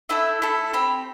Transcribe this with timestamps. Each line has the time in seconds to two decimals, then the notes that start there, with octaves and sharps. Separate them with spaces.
0.09 A3 E4 A4 E5
0.42 A3 E4 A4
0.73 C4 G4 B5